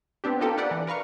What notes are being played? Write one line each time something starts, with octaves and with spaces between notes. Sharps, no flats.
B3 C4 D4 G4
A#3 D#4 F4 G4 A4 A#4
D4 G4 A#4 B4 D5 F#5
E3
A#4 B4 F5 C#6